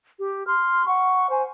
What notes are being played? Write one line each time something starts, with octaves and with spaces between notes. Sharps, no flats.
G4
C6 F6
F#5 C#6
C5 G#5